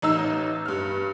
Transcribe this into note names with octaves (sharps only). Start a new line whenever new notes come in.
A1 D#4 E6
G2 F6